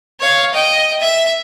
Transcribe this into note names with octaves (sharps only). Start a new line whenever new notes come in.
C#5 F5
D#5 G5
E5